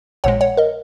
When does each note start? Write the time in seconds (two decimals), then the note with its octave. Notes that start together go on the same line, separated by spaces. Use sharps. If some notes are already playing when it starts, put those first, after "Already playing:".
0.24 A#1 A#2 G#3 C#5 F#5
0.41 C#5 F#5
0.57 A#4 D#5